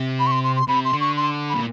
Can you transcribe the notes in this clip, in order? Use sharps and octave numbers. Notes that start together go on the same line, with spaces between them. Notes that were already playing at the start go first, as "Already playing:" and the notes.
Already playing: C3
B5
C#6
C6
C6
C6
C3 B5
C6
D3
C#6
C6
A#2 B5